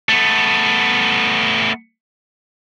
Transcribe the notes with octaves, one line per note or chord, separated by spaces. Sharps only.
A3 B3